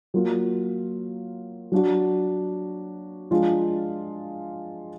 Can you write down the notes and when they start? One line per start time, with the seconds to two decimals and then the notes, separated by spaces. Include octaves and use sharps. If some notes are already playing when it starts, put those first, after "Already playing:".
0.14 F#3 A#3 F4
1.72 F#3 D4 F#4
3.31 F3 G#3 D4 F4